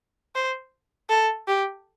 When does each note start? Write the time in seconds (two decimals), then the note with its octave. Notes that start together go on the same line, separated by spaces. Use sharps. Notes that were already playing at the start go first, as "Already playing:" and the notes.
0.35 C5
1.09 A4
1.48 G4